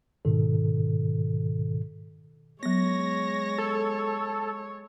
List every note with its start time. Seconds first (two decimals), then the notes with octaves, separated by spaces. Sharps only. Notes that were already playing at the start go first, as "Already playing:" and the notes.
0.25 G#2 B2 D#3 A4
2.63 F#3 G#3 B3 C#5 A#6
3.58 A4